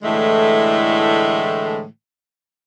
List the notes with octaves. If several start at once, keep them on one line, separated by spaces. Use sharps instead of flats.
A2 D3 E3 G#3 A3